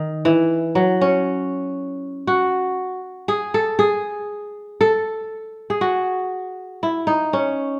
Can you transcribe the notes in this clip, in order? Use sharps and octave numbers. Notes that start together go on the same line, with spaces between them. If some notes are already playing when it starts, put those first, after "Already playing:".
Already playing: D#3
E3
F#3
C#4
F#4
G#4
A4
G#4
A4
G#4
F#4
E4
D#4
C#4